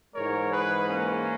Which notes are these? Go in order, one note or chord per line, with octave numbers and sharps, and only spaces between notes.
G#2 E3 G#3 A#4 C#5
G#4 B4
A#3 C#4